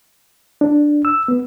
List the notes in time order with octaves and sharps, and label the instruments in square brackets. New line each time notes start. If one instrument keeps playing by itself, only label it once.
[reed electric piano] D4
E6
B3